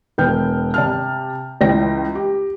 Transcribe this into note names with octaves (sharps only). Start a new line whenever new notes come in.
E1 B3 G5 F6 G6
C3 A5 F6
C#2 E3 G5 A#6
G4